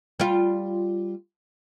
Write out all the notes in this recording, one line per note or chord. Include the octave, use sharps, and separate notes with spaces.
G3 F4